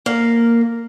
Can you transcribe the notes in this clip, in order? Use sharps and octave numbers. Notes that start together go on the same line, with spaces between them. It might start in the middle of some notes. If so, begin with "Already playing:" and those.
A#3